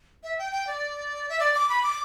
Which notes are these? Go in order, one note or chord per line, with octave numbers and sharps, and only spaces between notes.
E5
G5
G5
D5
E5
D5
D6
B5
D6